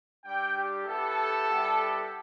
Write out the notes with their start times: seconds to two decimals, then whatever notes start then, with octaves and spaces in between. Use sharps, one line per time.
0.25 G3 D4 G4 G5
0.56 G4
0.87 B3 E4 G4 A4
1.48 G3 B3 E4 G4